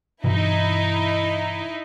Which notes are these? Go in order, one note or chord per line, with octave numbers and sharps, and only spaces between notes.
G2 B2 E3 D#4 E4